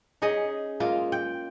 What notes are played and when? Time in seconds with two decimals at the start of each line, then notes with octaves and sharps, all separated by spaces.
0.22 C#4 D#4 G#4 D#5
0.80 G#3 A#3 F4
1.12 G5